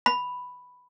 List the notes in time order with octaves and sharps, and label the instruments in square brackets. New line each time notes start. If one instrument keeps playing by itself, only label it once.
[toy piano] B5